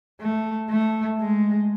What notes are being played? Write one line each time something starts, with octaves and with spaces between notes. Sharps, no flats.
A3
A3
G#3